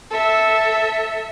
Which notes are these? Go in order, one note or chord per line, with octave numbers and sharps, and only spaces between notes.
A4 E5